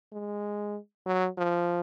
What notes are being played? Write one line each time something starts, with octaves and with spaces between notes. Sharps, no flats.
G#3
F#3
F3